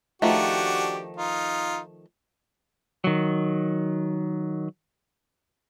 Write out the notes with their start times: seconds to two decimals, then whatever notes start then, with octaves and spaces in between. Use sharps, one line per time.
0.22 D#3 F3 A3 D4 F#4 G4
1.17 D#4 F4
3.04 D#3 F#3